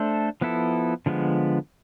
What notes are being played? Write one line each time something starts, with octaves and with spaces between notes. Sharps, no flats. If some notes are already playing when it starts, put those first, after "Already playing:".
Already playing: A3 D4 A4 C5
F3 B3 E4 A4
D3 F3 G#3 B3